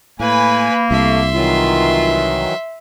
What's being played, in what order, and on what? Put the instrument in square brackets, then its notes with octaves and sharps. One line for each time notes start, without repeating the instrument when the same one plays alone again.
[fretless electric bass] A2 [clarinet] A#3 [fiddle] B4 B5 [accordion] G#5
[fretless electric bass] C2 [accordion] A3 [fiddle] E5 C6
[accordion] D#3 E3 F#3 [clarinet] F4